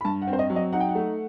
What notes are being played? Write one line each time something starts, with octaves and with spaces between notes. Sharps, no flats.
B5
G2 A5
F#5
C4
C5
D#5
F#3
D#5
D#4 F#5
G5
F#5
A3